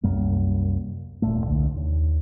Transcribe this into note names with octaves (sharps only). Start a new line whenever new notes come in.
C2 F#2 G3 A#3
D#1 G#1 A#2 A3
C2 D3
D#2